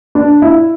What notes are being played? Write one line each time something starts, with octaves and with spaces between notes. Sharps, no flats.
D4
E4